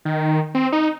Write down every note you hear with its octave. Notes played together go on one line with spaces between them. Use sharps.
D#3
C4
D#4